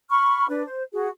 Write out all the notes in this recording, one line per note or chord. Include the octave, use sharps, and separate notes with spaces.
B5 C#6 F6
D4 B4 D5
C5
F#4 G#4